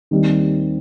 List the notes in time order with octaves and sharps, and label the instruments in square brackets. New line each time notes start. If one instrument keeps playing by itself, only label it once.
[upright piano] D#2 D#3 G3 C4 D#4